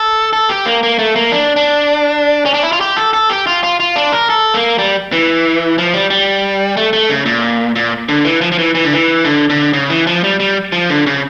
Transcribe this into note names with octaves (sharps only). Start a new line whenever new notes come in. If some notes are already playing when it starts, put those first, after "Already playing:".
Already playing: A4
A4
G4
A#3
A#3
A3
A#3
D4
D4
C#4
D4
E4
F4
G4
A4
A4
G4
F4
F4
F4
D4
A#4
A4
A#3
G3
E3
F3
G3
G3
A3
A3
C#3
A#2
A#2
D3
E3
F3
F3
E3
E3
D3
E3
D3
D3
C#3
E3
F3
G3
G3
F3
D3
C#3